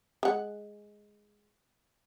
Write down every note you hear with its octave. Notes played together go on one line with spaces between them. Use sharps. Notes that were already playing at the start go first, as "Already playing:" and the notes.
G#3 F#5